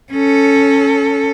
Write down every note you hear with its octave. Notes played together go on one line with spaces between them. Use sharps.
C#4 A4